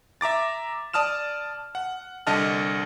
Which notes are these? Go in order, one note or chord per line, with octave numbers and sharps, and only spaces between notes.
E5 A#5 D6 A6
D5 A5 D#6 F6 E7
F#5
C2 D3 D#5 A5 F6